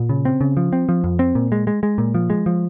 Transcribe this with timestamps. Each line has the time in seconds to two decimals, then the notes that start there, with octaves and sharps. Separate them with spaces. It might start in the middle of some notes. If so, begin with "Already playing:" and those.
Already playing: A#2
0.09 C#3
0.25 C4
0.41 C#3
0.57 F3
0.73 C4
0.89 F3
1.04 F2
1.19 C4
1.35 A#2
1.52 G#3
1.67 G#3
1.83 G#3
1.98 A#2
2.14 F3
2.30 G#3
2.46 F3